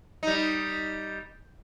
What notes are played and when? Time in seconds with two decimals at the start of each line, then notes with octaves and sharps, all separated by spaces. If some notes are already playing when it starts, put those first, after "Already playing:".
0.23 G3 D#4